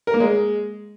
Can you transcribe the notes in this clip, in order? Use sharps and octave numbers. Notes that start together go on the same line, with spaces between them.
A#4
A#3
G#3